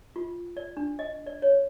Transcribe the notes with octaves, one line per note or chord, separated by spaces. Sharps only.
F4
D5
D4
D#5
D5
C#5